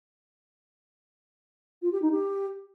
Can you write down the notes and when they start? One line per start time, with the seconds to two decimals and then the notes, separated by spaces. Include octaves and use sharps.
1.82 F4
1.92 G4
2.02 D#4
2.12 G4